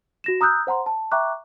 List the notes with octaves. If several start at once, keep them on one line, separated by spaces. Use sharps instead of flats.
F#4 A#6 E7
A#5 D#6 E6 F#6 G6
C5 F#5 A#5 C6
A5
E5 G5 A#5 C#6 D6 F#6